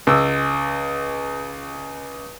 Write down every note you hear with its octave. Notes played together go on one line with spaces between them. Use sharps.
C#2 E6